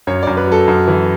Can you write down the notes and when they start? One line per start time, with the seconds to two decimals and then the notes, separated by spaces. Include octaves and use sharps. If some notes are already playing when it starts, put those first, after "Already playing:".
0.07 F#2 C#5
0.23 F#2 D5
0.37 B4
0.47 F#3 A4
0.68 F#2
0.88 E3